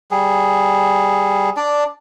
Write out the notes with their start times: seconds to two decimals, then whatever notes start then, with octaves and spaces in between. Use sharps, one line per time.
0.11 G3 G#4
1.56 D4 D5